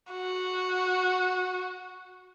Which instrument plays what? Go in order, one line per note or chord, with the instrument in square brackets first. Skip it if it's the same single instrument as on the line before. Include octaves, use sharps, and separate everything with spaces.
[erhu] F#4